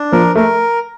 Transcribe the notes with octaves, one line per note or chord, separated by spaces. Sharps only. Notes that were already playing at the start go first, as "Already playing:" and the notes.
Already playing: D4
F3 A#4
A3 A#4